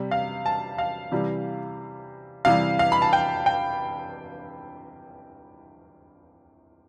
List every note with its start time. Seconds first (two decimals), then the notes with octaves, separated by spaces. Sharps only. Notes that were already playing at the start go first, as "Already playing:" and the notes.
Already playing: C3 G3
0.11 F5
0.46 A5
0.78 F5
1.12 C3 E3 G3
2.45 C3 E3 G3 F5
2.79 F5
2.92 B5
3.02 A5
3.13 G5
3.46 G5